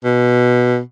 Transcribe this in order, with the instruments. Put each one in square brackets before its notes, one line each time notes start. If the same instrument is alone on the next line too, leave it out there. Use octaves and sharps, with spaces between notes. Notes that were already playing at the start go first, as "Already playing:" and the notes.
[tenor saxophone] B2